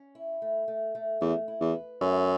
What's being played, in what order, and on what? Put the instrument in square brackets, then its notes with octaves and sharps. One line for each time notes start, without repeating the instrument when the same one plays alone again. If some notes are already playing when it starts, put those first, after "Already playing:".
Already playing: [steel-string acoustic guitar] C#4
E4
A3
A3
A3
[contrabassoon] E2 [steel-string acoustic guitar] A3
[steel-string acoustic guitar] E4
[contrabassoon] E2
[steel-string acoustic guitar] B4
[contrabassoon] F#2 [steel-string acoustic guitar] A3